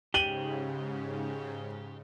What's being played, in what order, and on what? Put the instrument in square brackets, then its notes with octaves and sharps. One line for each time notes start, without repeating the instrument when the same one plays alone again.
[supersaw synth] G#2 C#3 [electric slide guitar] G4 [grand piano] D#7 F#7 G7